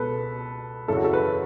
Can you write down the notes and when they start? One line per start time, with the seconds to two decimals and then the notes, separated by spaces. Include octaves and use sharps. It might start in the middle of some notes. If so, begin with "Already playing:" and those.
Already playing: C#2 B2 A4 B4
0.88 F#2 C#3 E3 A4
0.97 F#4
1.04 A4
1.13 B4